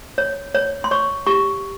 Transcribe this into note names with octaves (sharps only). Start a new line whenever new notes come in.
C#5
C#5
C6
C#5 C#6
G4 C#6